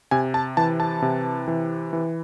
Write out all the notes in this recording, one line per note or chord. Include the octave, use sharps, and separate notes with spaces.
C3 G#5
A5
E3 A5
A5
C3
E3
E3